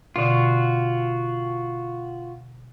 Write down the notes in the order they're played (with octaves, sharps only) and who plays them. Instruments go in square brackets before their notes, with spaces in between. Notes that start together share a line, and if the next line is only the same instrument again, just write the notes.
[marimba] B2 D3 [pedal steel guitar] F4 F#4